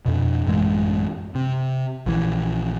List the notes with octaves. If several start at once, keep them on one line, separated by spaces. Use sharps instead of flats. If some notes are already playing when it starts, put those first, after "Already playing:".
F2 B2
A1 F#2 E3 G#3
C3
A#1 E3